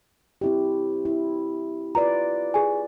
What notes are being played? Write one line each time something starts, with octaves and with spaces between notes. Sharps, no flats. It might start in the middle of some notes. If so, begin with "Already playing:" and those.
C4 E4 G4
E4
F4 B4 D5 A#5
G#4 G#5